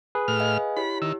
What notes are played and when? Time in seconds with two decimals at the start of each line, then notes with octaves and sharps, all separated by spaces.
0.15 G#4 B4
0.28 A2 F6
0.40 D#5 F5 G#5
0.77 E4 G4 C#5 B5
1.02 D#3 E6